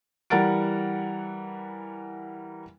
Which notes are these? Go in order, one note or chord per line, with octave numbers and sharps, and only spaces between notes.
E3 G3 A#4 F#5 A6 D7